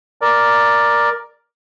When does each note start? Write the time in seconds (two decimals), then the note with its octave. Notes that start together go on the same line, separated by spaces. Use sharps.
0.21 A#4 D5